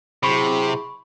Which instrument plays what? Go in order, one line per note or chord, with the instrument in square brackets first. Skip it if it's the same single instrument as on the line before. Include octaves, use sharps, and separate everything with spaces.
[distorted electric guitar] C3 [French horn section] F#3 E4 G#4 [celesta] B5 C#6